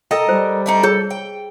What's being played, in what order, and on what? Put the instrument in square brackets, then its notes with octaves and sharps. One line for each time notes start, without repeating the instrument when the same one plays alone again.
[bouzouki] A4 A#4 D#5 [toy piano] G5
[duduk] G3 [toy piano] C5
[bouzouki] A3 D4 D#4
[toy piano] G#4 C#5 [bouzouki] A4
[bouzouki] G5